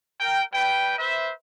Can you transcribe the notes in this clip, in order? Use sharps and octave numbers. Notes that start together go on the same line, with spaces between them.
A#4 G5
G3 B4 G5
B4 C5 E5